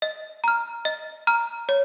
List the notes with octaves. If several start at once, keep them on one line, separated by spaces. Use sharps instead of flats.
D#5
A#5 F6
D#5
A#5 F6
C#5